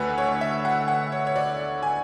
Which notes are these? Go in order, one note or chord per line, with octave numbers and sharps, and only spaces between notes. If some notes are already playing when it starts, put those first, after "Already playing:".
Already playing: D2 D3 A3 B4 F#5 G#5
C#5
E5
F#5
F#5
C#5
C#5
D5
G#5